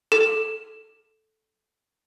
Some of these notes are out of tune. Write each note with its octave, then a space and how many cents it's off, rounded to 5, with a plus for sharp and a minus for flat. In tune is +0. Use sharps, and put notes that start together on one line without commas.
A4 -5